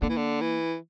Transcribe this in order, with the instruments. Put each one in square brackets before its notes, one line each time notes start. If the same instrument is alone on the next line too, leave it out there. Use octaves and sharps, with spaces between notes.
[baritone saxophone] D3 [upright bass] A#3
[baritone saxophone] E3
D3
E3